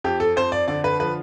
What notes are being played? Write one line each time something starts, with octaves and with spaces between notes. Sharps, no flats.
F2 G4
A4
F2 C5
D5
D3 D5
B4
F3 B4